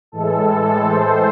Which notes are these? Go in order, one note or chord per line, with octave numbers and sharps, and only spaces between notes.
A2 E3 G#3 A4
C5